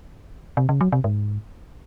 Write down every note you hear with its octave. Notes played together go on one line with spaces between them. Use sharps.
C3
C#3
F#3
C3
G#2